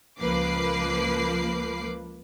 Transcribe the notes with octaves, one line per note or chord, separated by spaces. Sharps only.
C#2 F3 A#3 B4 D6 C7